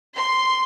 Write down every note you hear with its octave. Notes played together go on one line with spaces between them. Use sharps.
C6